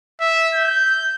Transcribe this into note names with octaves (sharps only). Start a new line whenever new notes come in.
E5
G6